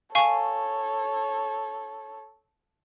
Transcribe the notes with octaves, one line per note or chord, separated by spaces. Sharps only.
A4 C#5 F5 G#5 C#6